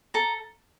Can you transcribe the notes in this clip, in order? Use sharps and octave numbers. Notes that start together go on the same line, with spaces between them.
A4 A#5